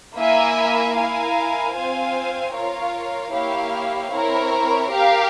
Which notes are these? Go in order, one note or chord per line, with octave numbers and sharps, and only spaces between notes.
A#3 E4 A#4 E5 G#5
E4 A#4 F5 G#5
C4 F4 C5 F5 G#5
F4 A#4 C#5 F5
A#3 E4 G4 C#5 F5
C4 E4 A#4 C#5
G4 A#4 F5